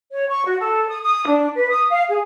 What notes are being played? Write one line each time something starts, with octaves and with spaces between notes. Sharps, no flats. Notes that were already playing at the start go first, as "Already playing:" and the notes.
C#5
C#6
F#4
A4
D#6
D#6
D4
B4
D#6
F5
G#4